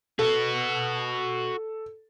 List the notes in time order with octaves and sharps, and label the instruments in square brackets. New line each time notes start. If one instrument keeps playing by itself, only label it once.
[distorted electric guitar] F#4 B4 [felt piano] A4